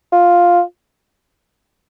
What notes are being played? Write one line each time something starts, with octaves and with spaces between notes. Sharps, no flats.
F4